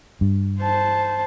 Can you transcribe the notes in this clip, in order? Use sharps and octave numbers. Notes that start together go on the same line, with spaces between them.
G2
C5 A5